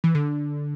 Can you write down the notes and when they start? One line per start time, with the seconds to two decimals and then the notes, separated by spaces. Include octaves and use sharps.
0.04 E3
0.15 D3